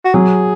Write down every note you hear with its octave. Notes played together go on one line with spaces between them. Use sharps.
F#4
F#3 G#4